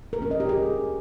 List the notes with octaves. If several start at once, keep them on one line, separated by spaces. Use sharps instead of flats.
A#4
C#4
D#5
G4
G#4